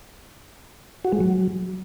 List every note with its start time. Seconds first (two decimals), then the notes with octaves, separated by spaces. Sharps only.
1.05 F#4
1.12 G#3
1.20 F#3